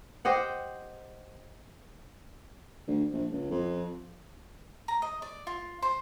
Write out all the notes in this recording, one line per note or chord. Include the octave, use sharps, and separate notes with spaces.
G4 C5 D#5 F#5
D2
A#1
C#2
F2
A#5
D#5
D5
F4
C5